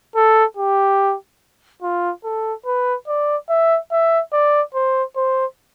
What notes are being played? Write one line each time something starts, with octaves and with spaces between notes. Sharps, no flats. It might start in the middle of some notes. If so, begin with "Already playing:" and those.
A4
G4
F4
A4
B4
D5
E5
E5
D5
C5
C5